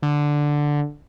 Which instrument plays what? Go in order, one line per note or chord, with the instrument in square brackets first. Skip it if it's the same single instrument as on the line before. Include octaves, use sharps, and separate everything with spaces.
[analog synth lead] D3